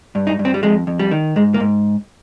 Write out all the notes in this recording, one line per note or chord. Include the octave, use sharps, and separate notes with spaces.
G2
D#4
G2
C4
G3
F2 G#3
F2
G3
D#3
G#2 G#3
A#3
G#2